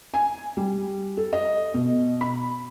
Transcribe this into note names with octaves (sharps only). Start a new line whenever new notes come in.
G#5
G3
A4
D#5
B2
B5